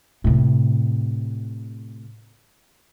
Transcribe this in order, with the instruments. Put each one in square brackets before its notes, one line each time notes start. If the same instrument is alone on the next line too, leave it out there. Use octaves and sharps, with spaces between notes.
[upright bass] A2 C3